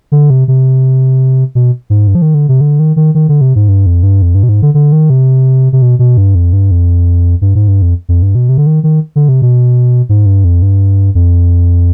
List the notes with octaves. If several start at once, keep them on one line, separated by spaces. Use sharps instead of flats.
D3
C3
C3
B2
G#2
G2
F3
D#3
D3
C3
D3
D#3
D#3
D#3
D3
C3
G#2
G2
F2
G2
F2
G2
B2
G#2
D3
D3
D#3
C3
C3
B2
B2
G2
F2
G2
F2
G2
G#2
G2
F2
F2
G2
B2
C3
D3
D#3
D#3
D3
C3
B2
G#2
G2
F2
G2
F2